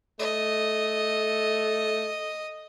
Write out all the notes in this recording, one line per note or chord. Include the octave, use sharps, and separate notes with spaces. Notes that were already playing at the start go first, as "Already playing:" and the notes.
A3 D#5